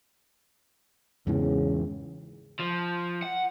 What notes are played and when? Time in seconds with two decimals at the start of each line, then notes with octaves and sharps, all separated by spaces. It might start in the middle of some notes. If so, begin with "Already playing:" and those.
1.27 E2 G#2 C#3 E3
2.60 F3
3.23 F#5